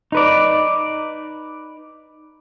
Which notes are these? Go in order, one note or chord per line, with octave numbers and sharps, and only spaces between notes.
D#4 B4 D5